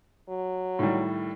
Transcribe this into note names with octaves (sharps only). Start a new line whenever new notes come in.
F#3
A2 D#3 G3